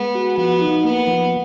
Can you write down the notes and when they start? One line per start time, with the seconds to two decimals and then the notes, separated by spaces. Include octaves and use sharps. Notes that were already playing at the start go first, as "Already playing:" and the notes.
Already playing: G#3 B3
0.15 F#4
0.37 F3 B3
0.61 D#4
0.84 A#3 B3
1.07 F3